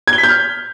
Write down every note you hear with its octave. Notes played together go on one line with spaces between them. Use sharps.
G#6
G7
B6
G6
F6